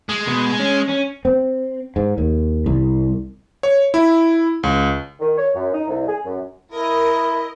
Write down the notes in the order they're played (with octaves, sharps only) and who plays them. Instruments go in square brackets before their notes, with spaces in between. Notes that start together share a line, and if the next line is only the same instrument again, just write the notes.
[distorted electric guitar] G#3
[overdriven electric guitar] B2
C#4
C#4
[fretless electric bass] C4
G#2
D#2
C2
[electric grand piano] C#5
E4
C#2
[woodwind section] D#3
C#5
F#2
D#4
C2
G#4
F#2
[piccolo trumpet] E4 [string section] A#4 D#5